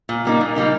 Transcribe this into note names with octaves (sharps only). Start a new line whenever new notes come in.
A#2
G3 A#3 D#4
A#2
G3 A#3 D#4